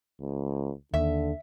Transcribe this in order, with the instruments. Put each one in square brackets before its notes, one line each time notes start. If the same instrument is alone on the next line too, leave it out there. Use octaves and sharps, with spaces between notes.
[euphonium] C#2
[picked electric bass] D#2 [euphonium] D3 [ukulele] E5